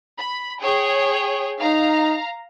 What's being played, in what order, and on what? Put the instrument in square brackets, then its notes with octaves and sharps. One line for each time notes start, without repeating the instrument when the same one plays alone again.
[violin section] B5
G#4 C#5 G5
[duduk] D#4 [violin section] F5 A#5